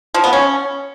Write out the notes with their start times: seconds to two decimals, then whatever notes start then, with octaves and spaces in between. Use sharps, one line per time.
0.14 F3
0.24 B3
0.33 C#4